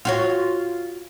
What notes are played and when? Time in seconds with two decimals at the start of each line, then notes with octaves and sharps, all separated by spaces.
0.05 F4 F#4 C#5